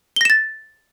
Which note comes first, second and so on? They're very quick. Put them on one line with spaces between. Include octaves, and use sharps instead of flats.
G7 A#6 E7 A6